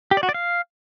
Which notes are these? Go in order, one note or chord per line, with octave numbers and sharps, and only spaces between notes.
G4
D5
F#4
D5
F5